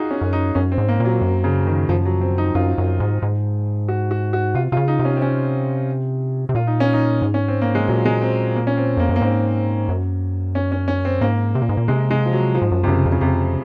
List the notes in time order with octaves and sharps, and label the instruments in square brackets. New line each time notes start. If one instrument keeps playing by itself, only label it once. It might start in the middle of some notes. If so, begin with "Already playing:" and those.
Already playing: [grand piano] D#4 F4 F#4 G#4
C#4
[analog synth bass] F#2
[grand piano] D#4
[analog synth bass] F#2 [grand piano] C#4
[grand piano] C4
[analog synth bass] G#2
[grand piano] A#3
[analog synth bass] A#2
[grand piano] F#3
[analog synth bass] F#2
[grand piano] C#3
D#3
[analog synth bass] F#2 [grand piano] F3
[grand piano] F#3
C4
D#4
[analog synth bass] F#2 [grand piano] F4
[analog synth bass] F#2
G#2
G#2
[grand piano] F#4
F#4
F#4
[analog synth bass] C3 [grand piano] F4
[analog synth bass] C3 [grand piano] F4
[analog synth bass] C#3
[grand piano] D#4
[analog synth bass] C3
[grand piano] C#4
C4
C#4
[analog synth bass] C3
[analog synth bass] A#2 [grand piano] F4
[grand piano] D#4
C#4
D#4
[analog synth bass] G#2
[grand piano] C#4
C4
A#3
G#3
[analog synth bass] A#2 [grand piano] F#3
[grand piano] G#3
C4
A#3
C#4
C4
[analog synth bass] F2 [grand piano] A#3
[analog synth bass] F#2
[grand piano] A#3
[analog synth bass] G#2 [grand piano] C4
[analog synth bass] F#2
[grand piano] C#4
C#4
C#4
C4
[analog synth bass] G#2 [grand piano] A#3
[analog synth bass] C3
A#2
G#2
A#2
[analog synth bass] C3 [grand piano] G#3
[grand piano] G#3
F3
F#3
F3
[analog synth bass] G#2
F#2
[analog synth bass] G#2 [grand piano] C3
[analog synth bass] F#2 [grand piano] C#3
[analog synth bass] F2
[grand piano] C#3
[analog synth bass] F2 [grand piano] C3